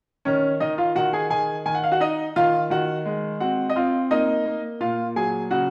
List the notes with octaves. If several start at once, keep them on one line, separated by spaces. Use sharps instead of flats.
D#3 C#4 C#5
D#3 D#4 D#5
F4 F5
D#3 F#4 F#5
G#4 G#5
D#3 G#4 G#5
D#3 G#5
F#5
F5
F#4 F#5
D#4 D#5
D#3 F4 F5
D#3 F#4 F#5
G#3
C4 F#4 F#5
D#5
C4 F4 F5
A#3 D#4 D#5
A#3
A#2 F4 F5
F#3 G#4 G#5
C#3 F#4 F#5